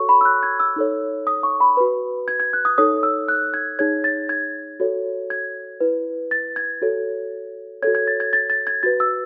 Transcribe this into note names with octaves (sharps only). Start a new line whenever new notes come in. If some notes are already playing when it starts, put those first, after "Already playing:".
Already playing: F#4 A4 C#5 C#6
B5
E6
F#6
G#6
E6
D#4 A4 C#5
D#6
C#6
B5
F#4 B4
G#6
G#6
F#6
D#6
D#4 A4 C#5 D#6
E6
F#6
G#6
D#4 G#4 C#5 G#6
A6
G#6
F#4 A4 C#5
G#6
E4 B4
A6
G#6
F#4 A4 C#5
F#4 A4 C#5 G#6
G#6
A6
G#6
A6
A6
G#6
F#4 B4 A6
E6